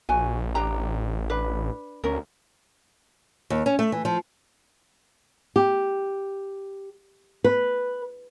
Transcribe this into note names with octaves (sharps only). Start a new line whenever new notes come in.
A#1 F#4 G#5
A1 D4 G4 A#5
D4 B4
D2 C#4 A#4
D#2
C#4
A3
E3
F3
G4
B4